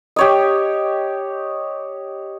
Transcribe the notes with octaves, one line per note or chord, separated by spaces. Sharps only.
G4 C#5 D#5